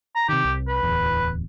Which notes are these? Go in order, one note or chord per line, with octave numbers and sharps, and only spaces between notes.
A#5
C3 D#3 G4
C2
B4
D1 E2